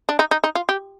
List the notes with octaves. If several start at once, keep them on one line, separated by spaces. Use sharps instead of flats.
D4
D#4
D#4
D#4
F4
G4